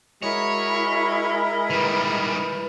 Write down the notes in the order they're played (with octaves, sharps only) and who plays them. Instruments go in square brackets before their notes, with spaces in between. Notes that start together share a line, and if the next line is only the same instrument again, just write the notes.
[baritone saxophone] G#3 [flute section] E4 A#4 B5 [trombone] F#4 [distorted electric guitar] C#5
[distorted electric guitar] D#3 G3 [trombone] B4